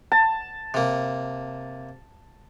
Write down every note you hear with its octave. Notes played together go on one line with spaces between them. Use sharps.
A5
C3 A#3